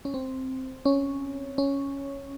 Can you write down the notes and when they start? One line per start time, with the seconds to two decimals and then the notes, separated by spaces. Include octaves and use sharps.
0.05 C#4
0.14 C4
0.85 C#4
1.58 C#4